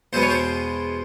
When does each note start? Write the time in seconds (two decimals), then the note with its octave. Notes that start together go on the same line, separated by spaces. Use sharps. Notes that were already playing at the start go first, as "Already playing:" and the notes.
0.13 E2 B2 G#3 B3 C5
0.22 C#5
0.30 C5